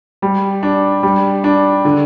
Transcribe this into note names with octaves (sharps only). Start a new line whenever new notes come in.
G3
D4
G3
D4
D3